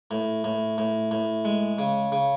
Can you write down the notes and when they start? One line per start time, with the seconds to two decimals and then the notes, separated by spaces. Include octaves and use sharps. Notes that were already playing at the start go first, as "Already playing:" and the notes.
0.11 A2
0.44 A2
0.78 A2
1.11 A2
1.45 G#3
1.78 C#3
2.12 C#3